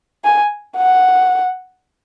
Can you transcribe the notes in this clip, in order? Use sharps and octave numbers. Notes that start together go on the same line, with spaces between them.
G#5
F#5